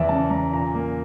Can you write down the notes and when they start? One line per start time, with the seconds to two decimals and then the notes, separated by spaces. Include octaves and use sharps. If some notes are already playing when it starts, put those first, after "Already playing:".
Already playing: E2 E3 D5 E5
0.09 C#3 A5
0.30 E2 A#5
0.53 A#2 A#5
0.75 A#3